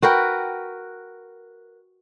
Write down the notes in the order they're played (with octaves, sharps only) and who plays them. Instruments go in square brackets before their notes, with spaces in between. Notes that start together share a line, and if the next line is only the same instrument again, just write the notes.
[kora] F#4 A#4 B4 G5